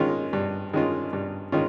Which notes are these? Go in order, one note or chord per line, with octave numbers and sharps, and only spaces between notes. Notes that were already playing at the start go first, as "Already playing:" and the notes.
Already playing: D#3 G#3 C#4 F4
G2
D#3 G#3 C#4 F4
G2
D#3 G#3 C#4 F4